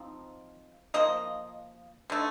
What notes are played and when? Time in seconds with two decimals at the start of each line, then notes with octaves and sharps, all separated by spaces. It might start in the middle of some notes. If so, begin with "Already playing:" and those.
Already playing: F3 C4 D#4
0.94 F3 A#3 D#4 D#5
2.10 D3 A3 D#4